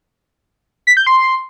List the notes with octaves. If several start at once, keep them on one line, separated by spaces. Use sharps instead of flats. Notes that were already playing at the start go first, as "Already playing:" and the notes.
B6
G6
C6